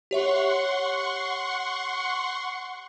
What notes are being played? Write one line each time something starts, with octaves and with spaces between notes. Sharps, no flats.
G4 C#5 E5 F#5 C6 C#6